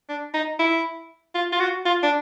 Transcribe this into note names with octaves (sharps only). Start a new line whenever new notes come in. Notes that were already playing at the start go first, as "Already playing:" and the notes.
D4
D#4
E4
F4
F4
F#4
F4
D4